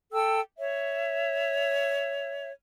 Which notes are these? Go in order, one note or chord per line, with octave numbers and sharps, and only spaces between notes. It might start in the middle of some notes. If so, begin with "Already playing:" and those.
A4 G5 E6
C#5 E5